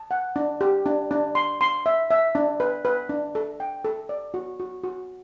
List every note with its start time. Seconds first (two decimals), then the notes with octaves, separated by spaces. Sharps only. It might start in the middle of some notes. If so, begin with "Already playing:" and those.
Already playing: A5
0.11 F#5
0.36 D4
0.61 G4
0.86 D4
1.11 D4
1.35 C6
1.61 C6
1.86 E5
2.11 E5
2.35 D4
2.60 B4
2.85 B4
3.09 D4
3.35 A4
3.60 G5
3.85 A4
4.09 D5
4.34 F#4
4.60 F#4
4.83 F#4